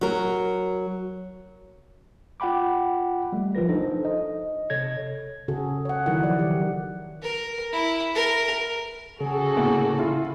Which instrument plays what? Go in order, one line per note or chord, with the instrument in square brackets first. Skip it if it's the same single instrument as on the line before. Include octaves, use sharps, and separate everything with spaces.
[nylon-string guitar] F#3 A#4
[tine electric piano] F4 F#5 G5 B5 D6
G3 A3
B1 F3 F4 A#4 B4 A#6
D4 D#4 A4 C5
D#5
C3 A4 C#5 G#6 A#6
[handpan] C#3 F#4 G#4 A4
C#5 F#5
D#3 F#3 A#3 E4 A#4 F#5
F3 D5
D#3 E3 F#3 G4 C5
[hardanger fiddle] A#4
E4
A#4
[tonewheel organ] C#3 [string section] F#4 A4 [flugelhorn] G#4
[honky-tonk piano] A2 A#3
[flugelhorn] E4 [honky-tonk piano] F4